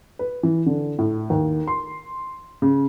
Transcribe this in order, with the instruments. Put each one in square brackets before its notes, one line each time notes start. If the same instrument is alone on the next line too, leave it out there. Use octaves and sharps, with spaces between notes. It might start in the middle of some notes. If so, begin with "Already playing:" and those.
[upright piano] B4
E3
D3
A2
D#2
C6
C#3